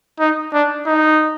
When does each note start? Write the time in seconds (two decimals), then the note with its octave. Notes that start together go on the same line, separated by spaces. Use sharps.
0.20 D#4
0.53 D4
0.86 D#4